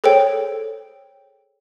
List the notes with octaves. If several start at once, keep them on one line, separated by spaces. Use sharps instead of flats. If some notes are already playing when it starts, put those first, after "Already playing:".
G#4 A4 C5 C#5 G5